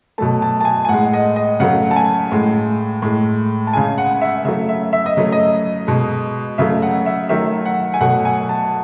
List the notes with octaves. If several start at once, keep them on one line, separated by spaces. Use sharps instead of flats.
B2 F#3 A3 A5
A5
A5
G#5
G#5
A2 G#3 F#5
D#5
D#5
C#3 F#3 A3 F#5
A5
G#5
A2 G#3
A2 G#3
A5
C#3 G#3 G#5
F#5
E5
C#3 F#3 A3 E5
E5
E5
D#5
C#3 F#3 A3
D#5
B2 G#3
C#3 F#3 A3 E5
F#5
E5
D#3 F#3 A3 E5
F#5
G#5
B2 F#3 A3 F#5
G#5
A5